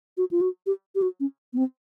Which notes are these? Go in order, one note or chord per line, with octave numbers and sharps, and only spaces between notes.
F#4
F4
F#4
G4
G4
F#4
C#4
B3
C4